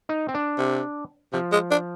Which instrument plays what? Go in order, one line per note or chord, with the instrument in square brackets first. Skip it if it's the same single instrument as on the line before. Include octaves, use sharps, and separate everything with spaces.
[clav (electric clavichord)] D#4
C4
D4
[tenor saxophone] C3
[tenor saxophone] C3 [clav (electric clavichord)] F3
[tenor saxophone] G#3
D4